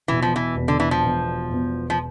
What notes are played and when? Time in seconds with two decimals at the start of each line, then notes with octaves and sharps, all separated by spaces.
0.08 E1 E2 B2 E3
0.22 F3
0.36 E3
0.56 E1 E2 B2
0.68 D3
0.80 E3
0.91 F3
1.04 E1 E2 B2
1.51 E1 E2 B2
1.90 F3